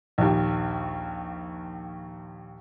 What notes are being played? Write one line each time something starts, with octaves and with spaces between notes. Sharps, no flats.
A#1 D#2